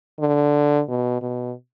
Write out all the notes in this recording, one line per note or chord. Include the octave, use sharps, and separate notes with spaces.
D3
B2
B2